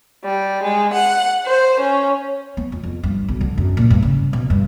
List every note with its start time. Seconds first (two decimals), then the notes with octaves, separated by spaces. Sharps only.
0.25 G3
0.64 G#3
0.95 F#5
1.47 C5
1.80 C#4
2.57 B3
2.72 F2
2.83 F2
3.04 G2
3.28 B1
3.41 D3
3.58 F#2
3.77 A#2
3.90 G2
4.02 C#3
4.33 B2
4.50 G2